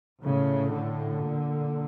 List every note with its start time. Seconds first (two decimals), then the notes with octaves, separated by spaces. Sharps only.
0.22 A2 C#3
0.74 D3
1.26 A#2